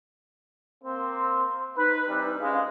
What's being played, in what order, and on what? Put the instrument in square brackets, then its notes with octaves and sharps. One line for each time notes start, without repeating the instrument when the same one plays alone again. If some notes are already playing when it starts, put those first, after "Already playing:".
[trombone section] A#3 C4 [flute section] C6
[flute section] D#4 [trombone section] B4
[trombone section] E3 G3 C4
[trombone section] D2 G#3 [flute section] C#4 F5